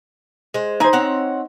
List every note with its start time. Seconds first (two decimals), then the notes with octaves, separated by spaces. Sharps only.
0.54 G#3 C5
0.80 E3 D#4 C5 G#5
0.93 C4 C#5 F#5